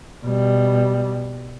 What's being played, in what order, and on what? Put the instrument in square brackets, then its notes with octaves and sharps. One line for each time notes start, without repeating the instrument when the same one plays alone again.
[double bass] B2 G3